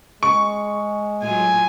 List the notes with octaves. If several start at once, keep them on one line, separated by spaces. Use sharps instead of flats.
G#3 C#6
A2 F#3 F4 G#5